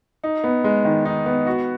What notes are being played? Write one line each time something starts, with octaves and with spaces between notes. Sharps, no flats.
D#4
B3
G#3
D#3
D#4
B3
F#4